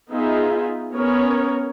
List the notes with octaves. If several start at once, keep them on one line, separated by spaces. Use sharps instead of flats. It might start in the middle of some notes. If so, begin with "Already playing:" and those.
B3 D#4 F4 G#4 E5
B3 C#4 A#4 C#5